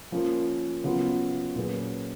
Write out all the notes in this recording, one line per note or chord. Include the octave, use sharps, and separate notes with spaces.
F3 A#3 C#4 F4 A#4
C#3 F#3 B3 F4
A#2 F#3 C#4 G#4 B4